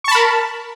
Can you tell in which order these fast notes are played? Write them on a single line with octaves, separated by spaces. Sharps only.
C#6 A5 B5 A#4